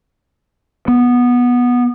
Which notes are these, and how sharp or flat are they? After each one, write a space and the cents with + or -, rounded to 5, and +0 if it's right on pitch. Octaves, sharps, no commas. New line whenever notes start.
B3 -10